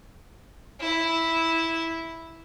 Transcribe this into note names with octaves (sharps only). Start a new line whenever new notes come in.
E4